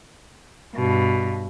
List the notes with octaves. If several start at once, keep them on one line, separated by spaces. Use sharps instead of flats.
G2 B2